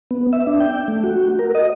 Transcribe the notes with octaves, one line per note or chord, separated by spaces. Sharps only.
B3
E5
D4
G5
A3
F#4
A#4
D#5